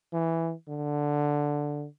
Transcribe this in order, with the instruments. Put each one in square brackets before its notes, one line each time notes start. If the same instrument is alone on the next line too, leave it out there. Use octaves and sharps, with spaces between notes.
[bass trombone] E3
D3